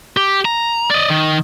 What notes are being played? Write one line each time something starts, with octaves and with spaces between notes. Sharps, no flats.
G4
A#5
D5 D#5
D#3